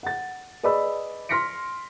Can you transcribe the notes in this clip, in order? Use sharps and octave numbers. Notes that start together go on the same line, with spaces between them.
F#5 A6
G#4 B4 D5 D#5 B5 E6
C6 F6 A#6 B6 C#7 D7